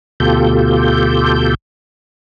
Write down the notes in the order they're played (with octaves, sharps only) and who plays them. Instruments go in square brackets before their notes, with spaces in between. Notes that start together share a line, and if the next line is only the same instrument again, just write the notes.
[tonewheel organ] D2 B2 F4 G4 A4 G6